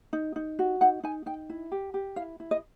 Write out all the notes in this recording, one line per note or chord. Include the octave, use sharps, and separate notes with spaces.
D#4
D#4
F#4
D#4 F#5
D#4 G#5
D#4 G5
E4
G4
G4
E4 F5
E4
D#5